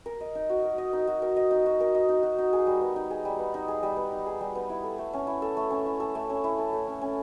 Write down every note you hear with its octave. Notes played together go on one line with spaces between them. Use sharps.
A#4
D#5
D#4
F#4
A#4
D#5
D#4
F#4
A#4
D#5
D#4
F#4
A#4
D#5
D#4
F#4
D#4
G#4
G3
B3
D#4
G#4
G3
B3
D#4
G#4
G3
B3
D#4
G#4
G3
B3
E4
A4
A3
C#4
E4
A4
A3
C#4
E4
A4
A3
C#4
E4
A4
A3
C#4
C#4